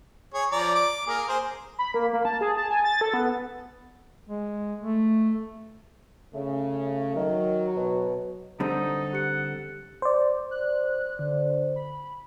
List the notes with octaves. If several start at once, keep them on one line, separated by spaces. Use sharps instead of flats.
G#4 C#5
F3 D5 A#5
D6
A#3 G#4 A#4
G#4 C5
B5
A#3
A#3
A5
G#4
A5
G#5
A6
A4
B3
G#3
A3
C#3 A3
D#3 F#3
B2
D3 G3 C4 D#4 A4
G4 F#5 C#7
C5 D5
F#6
D3
B5